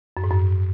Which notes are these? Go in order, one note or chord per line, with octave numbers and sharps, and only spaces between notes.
F#2
G#2
F#2